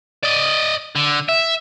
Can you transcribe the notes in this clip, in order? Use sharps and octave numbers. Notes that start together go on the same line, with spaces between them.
D5 D#5
D3
E5